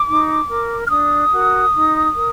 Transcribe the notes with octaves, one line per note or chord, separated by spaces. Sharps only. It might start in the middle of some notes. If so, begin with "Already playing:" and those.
Already playing: D6
D#4
A#4
F6
D4 D#6
F#4 A#4
D#4
A#4